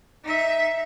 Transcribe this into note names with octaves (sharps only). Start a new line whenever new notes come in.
D#4 E5